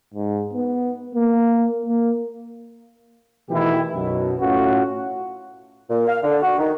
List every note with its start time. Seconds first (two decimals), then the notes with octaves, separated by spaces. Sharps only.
0.14 G#2
0.53 B3
1.15 A#3
1.86 A#3
3.50 B2 D#3 E3 A3 E4 G4
3.94 B1 F#2 B2
4.39 A2 A3 C#4 F4 F#4
5.90 A#2
6.07 F5
6.23 D3
6.42 F#4
6.58 D#3